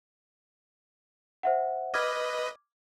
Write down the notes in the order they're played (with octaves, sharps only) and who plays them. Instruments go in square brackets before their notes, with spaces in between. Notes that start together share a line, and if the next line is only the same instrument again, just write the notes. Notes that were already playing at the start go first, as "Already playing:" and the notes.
[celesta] C5 E5 F#5
[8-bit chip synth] B4 D#5 [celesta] D6 F6 G#6